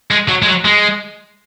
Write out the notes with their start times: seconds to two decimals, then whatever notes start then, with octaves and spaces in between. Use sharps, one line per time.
0.11 G#3
0.28 F#3
0.43 G#3
0.47 F#3
0.65 G#3